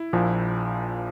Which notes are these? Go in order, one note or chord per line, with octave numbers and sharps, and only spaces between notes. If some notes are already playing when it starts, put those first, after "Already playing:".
Already playing: E4
A#1 A#2 F3